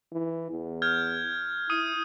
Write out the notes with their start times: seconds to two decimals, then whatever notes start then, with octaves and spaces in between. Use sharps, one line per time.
0.12 E3
0.51 E2
0.82 F6 G6 G#6
1.70 E4 D#6 D#7